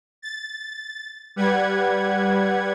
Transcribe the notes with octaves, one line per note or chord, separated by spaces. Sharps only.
A6
G3 B4 F#5 G#6